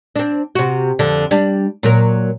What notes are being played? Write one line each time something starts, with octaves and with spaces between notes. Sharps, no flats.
C4 D4
C3 F#4
F2 D3
G3 D4
A#2 F#3 A#4